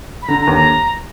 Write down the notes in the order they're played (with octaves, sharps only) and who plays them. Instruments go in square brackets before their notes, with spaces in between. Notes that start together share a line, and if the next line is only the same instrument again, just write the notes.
[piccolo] B5
[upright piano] D3 [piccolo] A#5
[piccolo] A#5
[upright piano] D#2
[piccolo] A#5